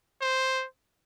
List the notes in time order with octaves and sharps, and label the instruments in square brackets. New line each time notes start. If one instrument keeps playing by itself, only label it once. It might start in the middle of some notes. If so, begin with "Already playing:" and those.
[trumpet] C5